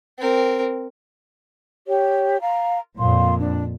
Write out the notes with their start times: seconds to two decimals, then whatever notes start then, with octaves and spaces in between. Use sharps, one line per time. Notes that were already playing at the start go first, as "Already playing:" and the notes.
0.19 C4 A#4
1.87 G4 C#5
2.40 F5 A#5
2.98 F2 A#2 F5 C6
3.38 D4